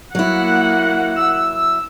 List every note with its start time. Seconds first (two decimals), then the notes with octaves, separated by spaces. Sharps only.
0.15 F#3 A#3 E4 F#5
1.16 E6